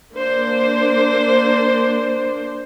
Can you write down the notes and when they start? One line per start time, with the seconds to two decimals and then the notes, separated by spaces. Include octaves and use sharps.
0.15 A#3 D4 C5